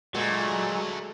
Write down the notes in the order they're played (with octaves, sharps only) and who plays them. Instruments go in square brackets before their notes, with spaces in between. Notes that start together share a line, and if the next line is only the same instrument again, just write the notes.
[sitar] A#2 [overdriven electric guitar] F#3 [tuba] G#3 [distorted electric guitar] A3 F#4